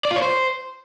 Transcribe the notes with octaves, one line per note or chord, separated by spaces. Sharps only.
D5
F4
C#5
C5